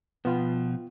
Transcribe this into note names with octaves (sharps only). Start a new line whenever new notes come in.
B2 F3 B3 F4 G5